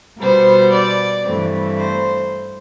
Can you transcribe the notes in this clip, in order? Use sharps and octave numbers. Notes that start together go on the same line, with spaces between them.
B2 G3 B3 C5
D5
G2 E3 A3 C4
C5